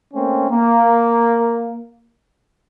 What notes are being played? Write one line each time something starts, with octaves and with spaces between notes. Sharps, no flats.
A3 A#3 C4 C#4
A#3